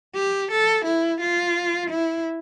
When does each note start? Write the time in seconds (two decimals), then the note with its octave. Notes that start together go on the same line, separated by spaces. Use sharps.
0.15 G4
0.51 A4
0.85 E4
1.21 F4
1.90 E4